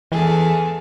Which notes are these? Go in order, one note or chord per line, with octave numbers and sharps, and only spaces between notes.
E2 E3 G#4 A4